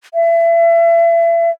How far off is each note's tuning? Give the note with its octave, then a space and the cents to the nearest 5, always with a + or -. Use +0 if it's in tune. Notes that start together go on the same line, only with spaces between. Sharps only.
E5 +35